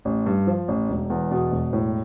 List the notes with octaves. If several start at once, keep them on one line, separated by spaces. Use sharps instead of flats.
A1
G2
F3
A1
E1
E2
B2
E1
A2